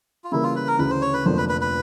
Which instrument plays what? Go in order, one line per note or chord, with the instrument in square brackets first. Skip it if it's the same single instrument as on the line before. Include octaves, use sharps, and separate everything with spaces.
[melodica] F4
[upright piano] C#3 E3 G3 A#3 [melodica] E4
[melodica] F4
B4
A#4
[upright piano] D2 C#3 E3 [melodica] B4
[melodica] C5
C#5
B4
[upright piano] F1 F2 D3 F3 A#3 [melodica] C5
[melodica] B4
B4
B4